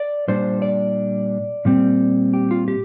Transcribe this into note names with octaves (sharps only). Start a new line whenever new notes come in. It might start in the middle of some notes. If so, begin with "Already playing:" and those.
Already playing: D5
A#2 G3 D4 C5
D5
A#2 G3 C4
G4
F4
G4